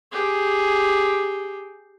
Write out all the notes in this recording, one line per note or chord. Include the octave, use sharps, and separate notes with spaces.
G4 G#4